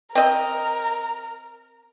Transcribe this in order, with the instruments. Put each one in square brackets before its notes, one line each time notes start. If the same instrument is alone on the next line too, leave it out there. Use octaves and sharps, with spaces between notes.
[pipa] C4 D#5 [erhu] A#4